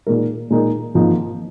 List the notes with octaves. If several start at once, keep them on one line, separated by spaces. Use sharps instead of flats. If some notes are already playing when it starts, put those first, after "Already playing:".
A#2 G#3 D#4 A#4
A#2 G#3 D#4 A#4
G#1 G#2 F3 A#3 D#4